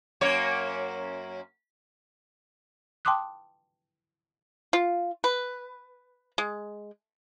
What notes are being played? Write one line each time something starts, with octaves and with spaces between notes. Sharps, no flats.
F#2 A#3 C#5
G5 A5 C6 D6 D#6 F#6
F4
B4
G#3